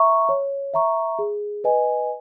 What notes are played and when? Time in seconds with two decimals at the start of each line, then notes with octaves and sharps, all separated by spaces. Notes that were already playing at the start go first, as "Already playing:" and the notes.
Already playing: E5 A#5 C#6
0.29 C#5
0.74 E5 A#5 C#6
1.19 G#4
1.64 B4 D#5 G#5